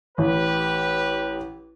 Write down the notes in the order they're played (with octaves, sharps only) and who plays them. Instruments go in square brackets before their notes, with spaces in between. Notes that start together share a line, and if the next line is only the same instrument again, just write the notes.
[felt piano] A1 [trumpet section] G4 B4